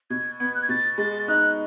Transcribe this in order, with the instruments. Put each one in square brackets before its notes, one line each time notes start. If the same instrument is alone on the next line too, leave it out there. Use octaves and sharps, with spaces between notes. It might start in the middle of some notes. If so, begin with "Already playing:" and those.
[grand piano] B2 [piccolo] G#6
[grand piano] B3 [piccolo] G#6
[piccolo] F#6
G#6
[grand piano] B2 [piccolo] A6
[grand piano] G#3 [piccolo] A6
[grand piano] D#4 [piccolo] F#6